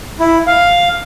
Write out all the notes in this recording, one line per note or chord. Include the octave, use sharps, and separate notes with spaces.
E4
F5